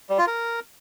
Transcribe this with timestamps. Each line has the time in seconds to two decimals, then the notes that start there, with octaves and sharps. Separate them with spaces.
0.10 G3
0.18 F4
0.27 A#4